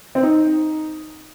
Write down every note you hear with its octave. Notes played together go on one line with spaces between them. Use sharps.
C4
D#4